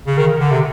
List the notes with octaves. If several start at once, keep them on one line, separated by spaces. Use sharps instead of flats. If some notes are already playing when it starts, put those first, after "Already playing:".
C#3
D#3
D3
C3